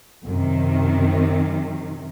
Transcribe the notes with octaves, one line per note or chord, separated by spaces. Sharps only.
F#2 C3 D#3